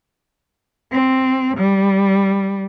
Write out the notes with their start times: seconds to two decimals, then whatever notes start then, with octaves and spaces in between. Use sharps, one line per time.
0.91 C4
1.57 G3